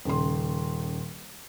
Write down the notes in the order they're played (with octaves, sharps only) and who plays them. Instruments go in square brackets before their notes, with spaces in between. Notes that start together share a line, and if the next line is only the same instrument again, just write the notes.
[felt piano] D#1 C#3 C6